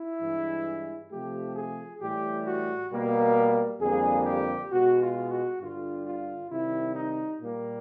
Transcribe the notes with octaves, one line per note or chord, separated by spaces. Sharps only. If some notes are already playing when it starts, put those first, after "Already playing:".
Already playing: E4
G2 E3 G#3
C3 F3 A3 G4
G#4
A2 E3 G3 G4
F#4
B2 G3 A#3
F2 D3 G3 A#3 G#4
G4
B2 G#3 F#4
F4
F#4
G2 D3 G3 F4
F4
C3 D#3 G3 E4
D#4
A#2 G3 A#3